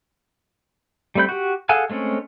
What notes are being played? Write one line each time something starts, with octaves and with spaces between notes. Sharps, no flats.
G3 A3 C4 B5 G6
F#4 G4
G#4 A4 F5 F#5 G#5
G#3 A3 C4 C#4